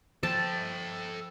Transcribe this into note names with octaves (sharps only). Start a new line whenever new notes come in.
F3 A4 C5 G5 A5